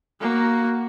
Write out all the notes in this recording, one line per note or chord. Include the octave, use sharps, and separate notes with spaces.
A#3 F#4